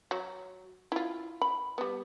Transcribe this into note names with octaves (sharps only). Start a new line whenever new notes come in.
F#3
E4 F4
B5
G3 B3